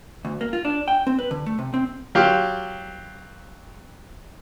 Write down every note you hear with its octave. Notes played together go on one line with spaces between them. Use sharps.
D2
A#3
F4
D4
G5
C4
B4
D3
A3
C3
C4
F#3 F4 G4